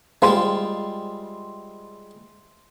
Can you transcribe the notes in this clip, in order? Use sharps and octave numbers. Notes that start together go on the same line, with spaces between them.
G3 G#3 F4 C6 E6